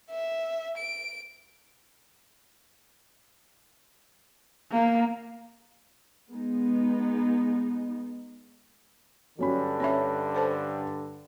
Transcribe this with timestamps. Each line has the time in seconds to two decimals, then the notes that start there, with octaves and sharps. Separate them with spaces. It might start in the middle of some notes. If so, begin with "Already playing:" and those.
0.11 E5
0.77 D7
4.72 A#3
6.33 G#3 B3 D#4
9.39 G2 D3 F#3 C#4 B5
9.80 C#4 C#5 E5 B5
10.34 A4 C5 A5